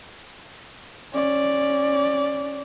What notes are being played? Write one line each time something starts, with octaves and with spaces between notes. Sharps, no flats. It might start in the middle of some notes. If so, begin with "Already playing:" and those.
C#4 D5